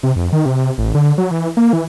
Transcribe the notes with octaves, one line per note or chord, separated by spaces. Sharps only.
C3
F2
D#3
C3
A1
D3
F#3
E3
A#3
E3